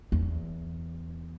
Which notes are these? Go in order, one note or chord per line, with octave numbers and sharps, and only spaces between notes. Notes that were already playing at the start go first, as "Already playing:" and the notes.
E2